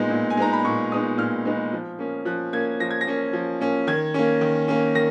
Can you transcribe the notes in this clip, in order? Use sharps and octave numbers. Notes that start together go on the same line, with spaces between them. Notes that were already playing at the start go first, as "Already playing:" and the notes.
Already playing: A#2 G#3 B3 D#4
A#2
G#5
G#3 B3 D#4 A#5
B5
A#2 C#6
G#3 B3 D#4 D#6
A#2 F6
G#3 B3 D#4
F3
A#3 C#4
F3 F#6
A#3 C#4 G#6
F3 A#6
G#6
A#6
A#3 C#4
F3
A#3 C#4
D#3 G#6
A#3 C#4
D#3
A#3 C#4
D#3 A#6